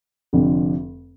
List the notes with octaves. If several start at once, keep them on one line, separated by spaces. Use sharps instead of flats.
F1 F2 D3